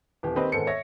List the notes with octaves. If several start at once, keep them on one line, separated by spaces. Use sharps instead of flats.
D#1 E3 G4
D#3 C4 G4 B4 C5 D#5
G#2 D#3 B3 A4 C5 C#7
C#5 E5 A#6